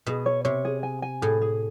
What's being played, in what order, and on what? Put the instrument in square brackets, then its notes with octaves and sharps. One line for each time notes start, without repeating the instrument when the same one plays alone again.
[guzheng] B2 [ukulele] G#4
[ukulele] C#5
[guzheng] C3 [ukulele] C#5
[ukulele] G#4
G#5
G#5
[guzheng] A2 [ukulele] G#4
[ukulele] G#4